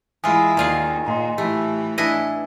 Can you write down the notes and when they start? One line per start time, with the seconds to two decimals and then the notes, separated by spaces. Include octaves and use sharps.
0.24 E3 G#3 E4 F4 G#5 D#6
0.57 D#2 D#3 F4 G#4 D5 A#5
1.05 A#2 D#5 A#5 C6
1.38 A2 E3 A3 G4
1.98 D4 E4 B4 D#5 G#5